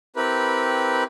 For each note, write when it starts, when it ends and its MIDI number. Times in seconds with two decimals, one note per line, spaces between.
0.16 1.04 60
0.16 1.04 64
0.16 1.04 67
0.16 1.04 70
0.16 1.04 71
0.16 1.04 83